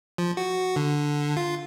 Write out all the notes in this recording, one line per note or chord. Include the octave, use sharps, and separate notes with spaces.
F3
F#4
D3
F4